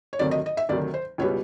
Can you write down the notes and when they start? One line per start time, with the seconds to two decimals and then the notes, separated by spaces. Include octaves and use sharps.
0.13 C#5
0.19 D2 C3 D#3 F#3 D5
0.31 D#5
0.46 D#5
0.57 E5
0.69 D2 C3 D#3 F#3 D5
0.94 C5
1.18 C#2 B2 G3 B3 C#5